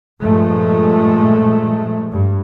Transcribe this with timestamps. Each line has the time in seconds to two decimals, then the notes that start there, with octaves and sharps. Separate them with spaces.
0.22 G2 A#2 F3 G#3 A3
2.10 G2